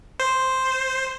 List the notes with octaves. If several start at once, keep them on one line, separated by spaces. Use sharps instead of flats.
C5